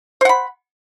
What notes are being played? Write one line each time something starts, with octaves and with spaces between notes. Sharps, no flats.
C5 F#5 B5